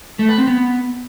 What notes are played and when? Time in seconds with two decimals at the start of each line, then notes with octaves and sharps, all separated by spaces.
0.19 A3
0.29 B4
0.38 C4
0.47 B3